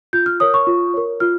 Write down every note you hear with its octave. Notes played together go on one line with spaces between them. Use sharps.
F4 G6
F6
A#4 C#5 D#6
C#6
F4
A#4 C#5
F4 F6